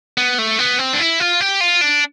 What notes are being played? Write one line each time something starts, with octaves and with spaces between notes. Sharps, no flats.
B3
A3
B3
C4
D4
E4
F4
G4
F4
D4